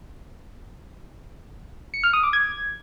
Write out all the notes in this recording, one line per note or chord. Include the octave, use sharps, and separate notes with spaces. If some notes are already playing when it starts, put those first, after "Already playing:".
C#7
F6
D#6
D6
G#6